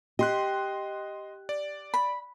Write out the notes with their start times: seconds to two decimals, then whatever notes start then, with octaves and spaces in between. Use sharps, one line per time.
0.19 G4 D#5 C6 F#6
1.49 D5
1.94 B5